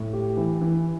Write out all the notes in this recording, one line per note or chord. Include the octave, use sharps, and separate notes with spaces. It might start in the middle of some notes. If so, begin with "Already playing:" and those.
Already playing: A2
G4
E3
E3